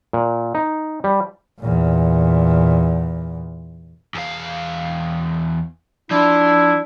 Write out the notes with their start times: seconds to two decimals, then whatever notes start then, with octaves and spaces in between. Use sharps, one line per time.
0.13 A#2
0.55 D#4
1.04 G3
1.60 E2 A#2
4.15 E2 F5
6.11 F3 D4 E4